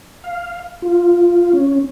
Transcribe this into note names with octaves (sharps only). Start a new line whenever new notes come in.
F5
F4
C#4